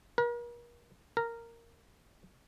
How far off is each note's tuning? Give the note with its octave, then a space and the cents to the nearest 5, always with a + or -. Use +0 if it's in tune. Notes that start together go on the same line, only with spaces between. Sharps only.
A#4 +40
A#4 -10